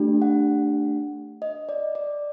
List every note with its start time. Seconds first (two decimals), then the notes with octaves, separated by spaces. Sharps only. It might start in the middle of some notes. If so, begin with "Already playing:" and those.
Already playing: A3 D4 G4
0.22 F#5
1.42 D#5
1.69 D5
1.95 D5